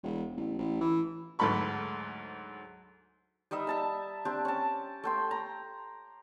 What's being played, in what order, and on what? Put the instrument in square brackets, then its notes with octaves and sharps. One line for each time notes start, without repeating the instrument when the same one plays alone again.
[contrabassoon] E1
A1
A1
E3
[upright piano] D2 G#2 F#3 A4 B5 C#6
[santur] G3 D#4 D#5 E5
E5 A5 A#5
C4 D4 G4
C#4 A5
A3 G5 C6
A#5